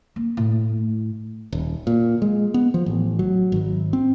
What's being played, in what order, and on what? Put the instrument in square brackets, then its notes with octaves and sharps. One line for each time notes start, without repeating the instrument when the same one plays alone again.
[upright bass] A#3
A2
[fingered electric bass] D#1
A#2
G#3
B3
F3
A1
F#3
G#1
C4